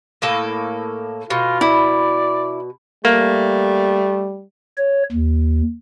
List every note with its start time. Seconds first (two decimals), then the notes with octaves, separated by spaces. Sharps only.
0.22 A2 A#3 A4
1.30 B2 F4
1.61 E4 D5
3.05 G3 A3 A#3
4.78 C#5
5.12 D#2